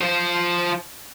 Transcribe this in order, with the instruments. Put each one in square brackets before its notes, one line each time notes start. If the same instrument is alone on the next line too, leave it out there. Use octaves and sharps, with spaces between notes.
[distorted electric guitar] F3 C5